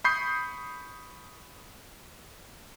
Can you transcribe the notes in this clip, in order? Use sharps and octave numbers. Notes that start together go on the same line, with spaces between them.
B5 C#6 D#6 G6 C7